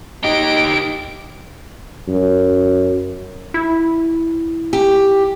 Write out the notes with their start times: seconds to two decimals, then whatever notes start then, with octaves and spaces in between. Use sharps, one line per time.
0.24 D#4 G4 D#5 D7
2.08 F#2
3.54 E4
4.73 G4